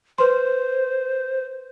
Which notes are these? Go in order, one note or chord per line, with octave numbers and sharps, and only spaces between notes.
B4 C5 C6